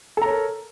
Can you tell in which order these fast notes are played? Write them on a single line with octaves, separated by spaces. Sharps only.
A4 A#5 C#5 A#4